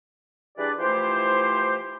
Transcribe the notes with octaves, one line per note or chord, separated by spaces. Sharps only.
E3 G3 D4 G#4 B4 D5
E3 F3 A3 E4 G4 C5